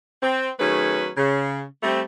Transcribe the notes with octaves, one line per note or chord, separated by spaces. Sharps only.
C4
D#3 F#3 A3 C#4 G#4 B4
C#3
G3 A3 C4